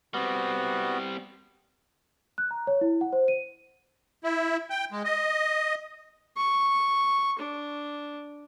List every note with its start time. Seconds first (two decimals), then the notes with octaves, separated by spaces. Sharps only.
0.14 G3 B3 C4 F#4
2.38 F#6
2.51 A#5
2.67 C#5
2.81 E4
3.01 F#5
3.13 C5
3.28 D#7
4.24 E4
4.70 G5
4.92 G#3
5.05 D#5
6.37 C#6
7.39 D4